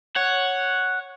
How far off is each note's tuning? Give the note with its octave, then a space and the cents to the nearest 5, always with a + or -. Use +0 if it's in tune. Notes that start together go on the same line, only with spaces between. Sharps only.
C#5 +0 F#5 +0